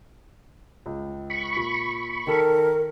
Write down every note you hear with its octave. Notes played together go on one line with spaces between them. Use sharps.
C#2
B5 C#6
A#2
D#3 A4 A#4